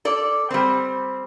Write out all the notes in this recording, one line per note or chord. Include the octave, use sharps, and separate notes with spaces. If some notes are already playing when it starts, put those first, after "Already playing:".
A4 D5
G3 C4